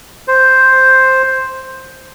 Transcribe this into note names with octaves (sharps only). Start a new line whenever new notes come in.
C5